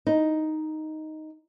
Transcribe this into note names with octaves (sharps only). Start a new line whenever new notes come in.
D#4